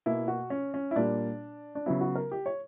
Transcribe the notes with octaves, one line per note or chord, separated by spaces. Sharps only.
B2 A#3 E4
F#4
C#4
C#4
E4
A#2 G3 A#3 D4
D4
C#3 F#3 B3 E4
F#4
A#4
G4
C#5